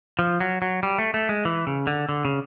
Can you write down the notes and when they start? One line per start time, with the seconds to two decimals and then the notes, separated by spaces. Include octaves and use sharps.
0.19 F3
0.40 F#3
0.62 F#3
0.83 G3
0.98 A3
1.14 A3
1.29 G#3
1.45 E3
1.67 C#3
1.87 D3
2.09 D3
2.25 C#3